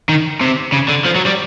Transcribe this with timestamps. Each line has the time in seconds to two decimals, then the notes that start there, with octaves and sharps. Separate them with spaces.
0.09 D#3
0.41 C3
0.72 C#3
0.88 D3
1.05 F3
1.15 F#3
1.26 G3